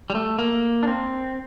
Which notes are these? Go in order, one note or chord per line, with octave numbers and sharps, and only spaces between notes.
G3
A3
A#3
D4
C4